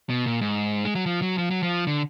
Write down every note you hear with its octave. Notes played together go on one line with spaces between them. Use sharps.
B2
A#2
G#2
G#3
F#3
F3
F#3
F3
F#3
F3
D3